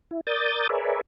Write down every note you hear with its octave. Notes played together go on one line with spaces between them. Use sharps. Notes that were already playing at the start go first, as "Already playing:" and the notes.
E4
A#4 D5 D#6 G6 A6
G#4 A#4 B4 C#5 D5 E5